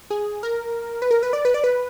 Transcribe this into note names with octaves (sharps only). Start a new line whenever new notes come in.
G#4
A#4
B4
A#4
B4
D5
B4
D5
B4